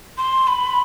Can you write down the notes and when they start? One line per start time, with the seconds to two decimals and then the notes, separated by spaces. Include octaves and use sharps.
0.18 C6
0.47 B5